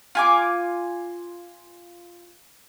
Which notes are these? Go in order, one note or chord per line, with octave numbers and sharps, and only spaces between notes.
F4 G#5 D6